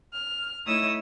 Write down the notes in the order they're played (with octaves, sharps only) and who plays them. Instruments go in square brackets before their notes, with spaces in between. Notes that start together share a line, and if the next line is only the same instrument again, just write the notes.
[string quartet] F6
A3 D#4 E4 C#5 D#6 E6